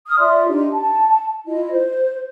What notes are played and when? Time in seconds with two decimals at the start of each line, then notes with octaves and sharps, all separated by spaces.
0.08 D#6 F6
0.19 F4 D5 E5 C6
0.48 D4 D#4 G4
0.72 A5
1.47 E4 F4 D#5
1.71 C5